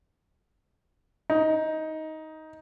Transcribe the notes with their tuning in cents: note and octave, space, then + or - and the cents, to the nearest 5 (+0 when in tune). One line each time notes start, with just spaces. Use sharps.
D#4 +15